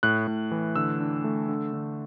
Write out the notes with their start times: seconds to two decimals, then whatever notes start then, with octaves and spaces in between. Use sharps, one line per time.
0.03 A2 F#6
0.27 A2
0.51 E3
0.76 D3 E6
1.00 D4
1.24 A3
1.49 D3
1.73 D3